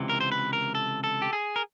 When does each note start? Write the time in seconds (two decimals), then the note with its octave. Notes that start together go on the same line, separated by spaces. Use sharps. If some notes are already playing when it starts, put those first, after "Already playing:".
Already playing: C#2 C3 E3
0.09 A#4
0.20 C5
0.32 B4
0.53 A#4
0.75 A4
1.04 A4
1.22 G4
1.33 G#4
1.56 A#4